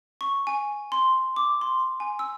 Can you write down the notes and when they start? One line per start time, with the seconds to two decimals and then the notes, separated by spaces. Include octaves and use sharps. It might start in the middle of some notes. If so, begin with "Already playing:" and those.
0.21 C#6
0.47 G#5
0.92 C6
1.36 D6
1.61 C6
2.00 G#5
2.19 E6